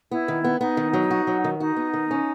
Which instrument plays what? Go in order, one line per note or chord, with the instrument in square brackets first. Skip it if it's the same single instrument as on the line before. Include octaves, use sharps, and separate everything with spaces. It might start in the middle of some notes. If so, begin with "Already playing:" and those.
[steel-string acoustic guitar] B3 [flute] E4
[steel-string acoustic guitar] D#3
B3
[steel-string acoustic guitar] B3 [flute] D#4
[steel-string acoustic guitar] D#3
F#3
F#4
F#3
D#3
[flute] D#4 [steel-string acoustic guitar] F#4
[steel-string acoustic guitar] B3
D#3
C#4